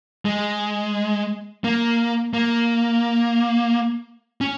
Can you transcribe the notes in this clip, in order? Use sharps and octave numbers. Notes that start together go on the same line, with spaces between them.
G#3
A#3
A#3
C#4